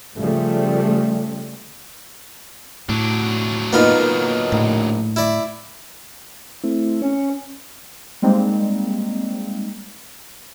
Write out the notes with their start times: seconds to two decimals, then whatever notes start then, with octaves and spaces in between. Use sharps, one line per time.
0.17 C#3 F3 G3 A3
2.89 A2 F#3 D4
3.73 A#3 B3 D#4 F4
4.52 A#1 A2
5.16 E4 D5
6.64 A3 C4 E4
7.02 C#4 C#5
8.22 G3 G#3 A#3 C4 D#4